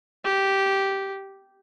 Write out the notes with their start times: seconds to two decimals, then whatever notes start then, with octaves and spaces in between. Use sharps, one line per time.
0.24 G4